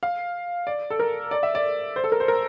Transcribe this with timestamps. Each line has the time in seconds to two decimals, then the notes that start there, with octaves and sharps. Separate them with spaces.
0.03 F5
0.67 D5
0.90 A4
0.99 A#4
1.31 D5
1.43 E5
1.55 D5
1.96 C5
2.04 A4
2.12 A#4
2.20 C5
2.28 A#4